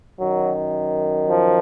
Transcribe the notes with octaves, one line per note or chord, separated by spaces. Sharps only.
F#2 D#3 F#3
F3